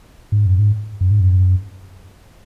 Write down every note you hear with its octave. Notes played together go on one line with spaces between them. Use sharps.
G#2
F#2
G#2
F#2
G#2
F#2